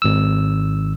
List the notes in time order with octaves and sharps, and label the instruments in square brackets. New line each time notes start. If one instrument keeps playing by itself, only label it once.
[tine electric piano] G#1 E6